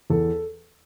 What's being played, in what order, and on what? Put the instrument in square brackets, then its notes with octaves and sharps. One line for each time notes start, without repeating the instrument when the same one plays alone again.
[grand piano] E2 A4